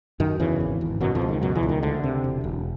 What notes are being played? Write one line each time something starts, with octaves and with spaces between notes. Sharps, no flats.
F#2 D#3
E2 C#3 E3
G#1
G#1
F#2 B2 F#3
F2 F3
C#2
D#3
F#2 B2 F#3
E2 E3
C#2
D#3
D2 D3
C3
E1
E1